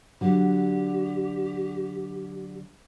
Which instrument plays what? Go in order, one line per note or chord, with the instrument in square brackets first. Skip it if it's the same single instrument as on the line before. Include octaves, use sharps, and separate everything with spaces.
[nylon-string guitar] D3 F#3 [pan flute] G4